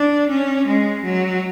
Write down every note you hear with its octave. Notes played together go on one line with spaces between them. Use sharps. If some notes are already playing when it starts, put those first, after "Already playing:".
Already playing: D4
C#4
G#3
F#3